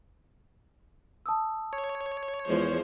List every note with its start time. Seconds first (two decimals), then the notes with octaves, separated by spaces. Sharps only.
1.26 A5 D#6 E6
1.73 C#5
2.49 E2 F3 G#3 C5